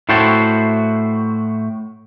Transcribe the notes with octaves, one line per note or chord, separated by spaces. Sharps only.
A2 E4 F#4 C5 G5 A5